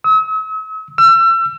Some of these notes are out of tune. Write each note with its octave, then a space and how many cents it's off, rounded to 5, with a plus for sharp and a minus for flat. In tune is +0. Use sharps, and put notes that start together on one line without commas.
E6 -45
E6 +35